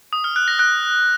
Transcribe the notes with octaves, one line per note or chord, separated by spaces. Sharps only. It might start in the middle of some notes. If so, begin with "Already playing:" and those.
D#6
F6
F#6
A#6
F#6